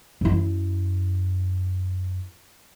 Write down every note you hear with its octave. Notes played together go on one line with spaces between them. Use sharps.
F#2 E4